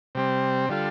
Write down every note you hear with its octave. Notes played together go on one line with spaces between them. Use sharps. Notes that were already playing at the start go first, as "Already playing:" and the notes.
C3 G3 C4
D3 G3 F4 A4